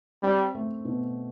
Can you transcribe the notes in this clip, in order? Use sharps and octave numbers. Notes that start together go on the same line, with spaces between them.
G3 C4
A3
B2